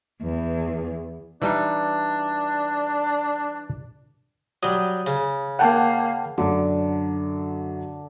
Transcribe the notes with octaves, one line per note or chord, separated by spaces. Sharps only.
E2
E3 G3 D4 D#4
F#3 G3 D#6
C#3
A#3 F#5 G5 A5
F#2 D3 F#3